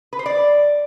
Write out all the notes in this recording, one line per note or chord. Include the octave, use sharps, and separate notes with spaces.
B4
C5
D5